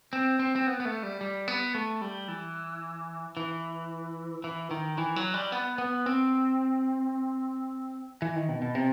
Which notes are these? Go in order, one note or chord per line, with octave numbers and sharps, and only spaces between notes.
C4
C4
C4
B3
B3
A3
G3
G3
B3
A3
G3
E3
E3
E3
D#3
E3
F#3
G3
B3
B3
C4
E3
D#3
B2
B2
C3